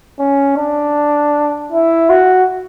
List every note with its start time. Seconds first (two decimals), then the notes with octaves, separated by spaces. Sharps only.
0.19 C#4
0.57 D4
1.72 E4
2.10 F#4